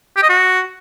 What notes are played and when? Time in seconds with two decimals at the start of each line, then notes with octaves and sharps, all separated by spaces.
0.16 G4
0.23 D#5
0.29 F#4